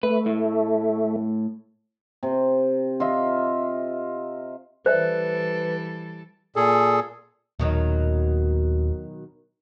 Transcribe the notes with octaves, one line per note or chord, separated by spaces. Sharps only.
A3 B4
A2
C3
F4 D#5 E5
E3 G3 A4 B4 C5 D5 E5
A#2 G#4 A4
D#1 B2 D#3 F#3